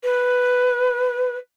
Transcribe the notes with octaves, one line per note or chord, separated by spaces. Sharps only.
B4